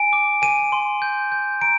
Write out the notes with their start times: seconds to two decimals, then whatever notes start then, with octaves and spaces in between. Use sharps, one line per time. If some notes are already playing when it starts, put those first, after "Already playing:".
Already playing: G#5 D7
0.13 D6
0.42 G#5 D#7
0.72 C6
1.02 G6
1.32 G6
1.61 A#5 D7